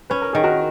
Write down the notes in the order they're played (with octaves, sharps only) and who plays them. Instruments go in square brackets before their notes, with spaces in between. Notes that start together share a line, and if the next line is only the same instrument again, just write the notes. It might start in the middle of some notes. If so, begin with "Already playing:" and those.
[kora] C#4 [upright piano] B4
[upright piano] A#4
[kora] D#3 [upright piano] G#4
[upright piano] F#4 A#4